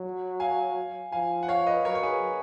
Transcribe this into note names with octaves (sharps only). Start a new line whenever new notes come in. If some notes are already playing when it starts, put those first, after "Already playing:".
Already playing: F#3
F5 G#5
F3 F5 G#5
F#5
C#5 F5
B4 D#5
F#3 A#4 C#5
C#5
G#4 B4